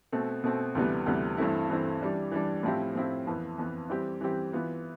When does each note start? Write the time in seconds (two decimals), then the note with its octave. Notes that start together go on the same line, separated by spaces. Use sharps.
0.12 B2 A3 C4
0.44 B2 A3 C4
0.75 D2 C3 E3 G3 B3
1.06 D2 C3 E3 G3 B3
1.37 G2 E3 A3 C4 E4
1.70 G2 E3 A3 C4 E4
2.01 E3 G3 D4
2.32 E3 G3 D4
2.63 A2 F3 C4 E4 G4
2.95 A2 F3 C4 E4 G4
3.27 F2 E3 B3
3.58 F2 E3 B3
3.89 E3 G3 C4 G4
4.21 E3 G3 C4 G4
4.53 E3 B3 F4